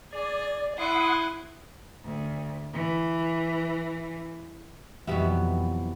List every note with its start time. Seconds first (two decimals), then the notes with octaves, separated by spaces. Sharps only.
0.13 G#4 D5
0.78 E4 F#5 C6 D#6
2.05 D2
2.73 E3
5.07 F2 B2 E3 F#3 G3 B3 F#4 E5